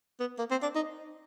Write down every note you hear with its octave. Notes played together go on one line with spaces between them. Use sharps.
B3
A#3
C4
D4
D#4